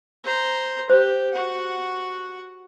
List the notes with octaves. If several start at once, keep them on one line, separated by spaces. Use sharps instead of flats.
C5 A#5
G4 C5
F#4 F#5